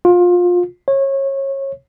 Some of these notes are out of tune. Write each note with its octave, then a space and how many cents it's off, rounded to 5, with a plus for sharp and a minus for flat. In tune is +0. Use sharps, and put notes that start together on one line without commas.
F4 +25
C#5 -25